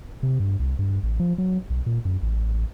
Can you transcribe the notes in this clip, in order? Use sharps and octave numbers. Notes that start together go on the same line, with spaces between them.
C3
G2
C2
G2
A1
F3
F#3
B1
A#2
F#2
A1